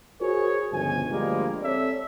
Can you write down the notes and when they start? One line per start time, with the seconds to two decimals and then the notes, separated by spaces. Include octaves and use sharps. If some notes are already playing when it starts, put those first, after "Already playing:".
0.20 F#4 G#4 A#4 C5 C#5
0.72 G1 C#2 B2 F3 G#5
1.11 D2 F3 G3 G#3 A#3
1.62 C4 A4 C#5 D5 E5